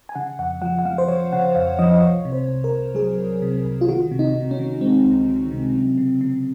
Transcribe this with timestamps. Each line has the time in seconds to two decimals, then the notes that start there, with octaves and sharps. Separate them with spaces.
0.09 G#5
0.15 C#3 F#5
0.39 F2 F#5
0.62 F3 F#5
0.79 F#5
0.85 F3 F5
0.98 C5
1.08 F3 C#5
1.32 C#3 F#5
1.55 F2 F5
1.79 F3 D#5
2.02 C2 C#5
2.25 C3
2.32 C5
2.48 C2
2.64 A#4
2.71 C2
2.95 F#3 G#4
3.18 C2
3.42 C3
3.65 C2
3.81 F4
3.88 D#3 F#4
4.11 C3
4.19 D#4
4.35 C3
4.51 C#4
4.59 D#3
4.81 G#3 C4
5.05 C#2
5.28 D#3
5.51 C3
5.75 F#3
5.98 C#3
6.21 C#3